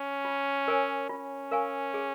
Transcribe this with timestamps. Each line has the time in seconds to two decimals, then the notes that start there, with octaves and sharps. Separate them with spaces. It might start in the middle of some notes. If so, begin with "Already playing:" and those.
Already playing: C#4
0.25 F4
0.68 A#4 C#5 G#5
1.09 C#4 F4
1.51 A#4 F5 G#5 C#6
1.94 G#4